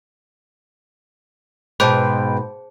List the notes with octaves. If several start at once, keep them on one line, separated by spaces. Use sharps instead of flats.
G#2 B2 G#4 B4 C5 G5 A5